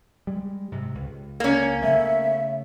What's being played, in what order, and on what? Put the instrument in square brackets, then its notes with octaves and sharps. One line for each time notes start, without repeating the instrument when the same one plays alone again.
[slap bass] G3 G#3
G#2 C3
C#2
[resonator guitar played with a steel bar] A#3 C#4
[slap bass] C#3 A3 B3 [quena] E5